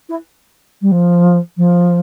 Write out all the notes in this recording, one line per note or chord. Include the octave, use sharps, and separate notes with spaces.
E4
G3
F3
F3